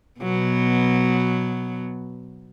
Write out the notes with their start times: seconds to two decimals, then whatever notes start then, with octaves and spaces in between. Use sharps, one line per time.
0.21 B2 F#3 B3